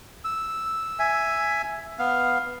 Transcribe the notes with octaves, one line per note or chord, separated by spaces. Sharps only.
E6
E5 G#5
B3 F5